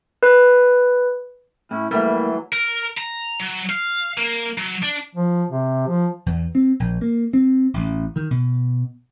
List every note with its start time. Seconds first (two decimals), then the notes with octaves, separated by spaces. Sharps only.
0.23 B4
1.71 A2 C#4 E4
1.91 E3 F#3 G3 A3 A#3 E5
2.53 A#4
2.97 A#5
3.40 F#3
3.69 F5
4.18 A#3
4.58 F#3
4.83 D4
5.15 F3
5.50 C3
5.88 F3
6.26 E2
6.55 C4
6.80 A#1
7.01 A#3
7.33 C4
7.74 A1
8.16 D#3
8.31 B2